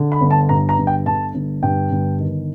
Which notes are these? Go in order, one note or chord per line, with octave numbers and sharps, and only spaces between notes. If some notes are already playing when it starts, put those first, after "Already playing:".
Already playing: D3
B5
G1
A5
G2 A#5
A#5
G1
G5
D3 A5
G1
G2 G5
G1
D#3